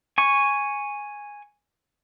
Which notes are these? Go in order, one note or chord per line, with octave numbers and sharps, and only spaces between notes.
G#5 C#6